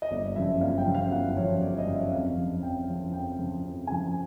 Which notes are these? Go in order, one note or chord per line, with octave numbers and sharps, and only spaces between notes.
D#5
G1 D5
F#2 C#3 F3 E5
G1 F5
G5
F#2 C#3 F3
F5
G1 F#5
F#2 C#3 F3 C#5
G1 D5
D#5
F#2 C#3 F3
E5
F2 F5
C#3 F3
F2 G5
C#3 F3
F2 G5
C#3 F3
F2
C#3 F3 G#5